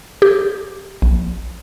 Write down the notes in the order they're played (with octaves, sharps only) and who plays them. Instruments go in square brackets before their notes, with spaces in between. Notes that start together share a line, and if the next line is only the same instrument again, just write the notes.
[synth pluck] G4
A#1